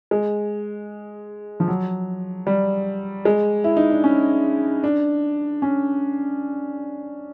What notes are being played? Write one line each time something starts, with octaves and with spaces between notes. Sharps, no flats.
G#3
F3
F#3
G3
G#3
E4
D#4
D4
C#4
D4
C#4